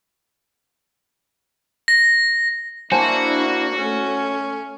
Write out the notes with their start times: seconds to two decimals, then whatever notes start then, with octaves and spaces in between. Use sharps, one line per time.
1.88 A#6
2.92 A#3 D4 E4 F#4 C5 G#5 A5
3.78 A3 C#4